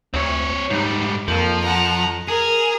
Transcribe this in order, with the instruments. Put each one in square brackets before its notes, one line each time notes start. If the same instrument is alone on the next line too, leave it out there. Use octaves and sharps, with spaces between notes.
[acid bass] D2 [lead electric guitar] C4 C#5
[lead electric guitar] G#2 G3 [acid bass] D#4
[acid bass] F2 [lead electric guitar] F3 [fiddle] A#3
[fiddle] F#5 A#5
[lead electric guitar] G#4 [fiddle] A#4